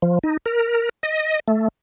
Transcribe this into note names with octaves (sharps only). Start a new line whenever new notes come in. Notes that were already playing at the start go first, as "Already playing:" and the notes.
F3
D#4
A#4
D#5
A3